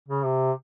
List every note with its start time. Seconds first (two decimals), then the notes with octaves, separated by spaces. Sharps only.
0.08 C#3
0.24 C3